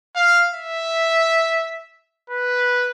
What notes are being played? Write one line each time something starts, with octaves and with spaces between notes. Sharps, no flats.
F5
E5
B4